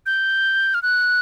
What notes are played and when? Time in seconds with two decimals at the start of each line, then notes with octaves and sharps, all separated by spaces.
0.06 G6
0.74 F6
0.83 F#6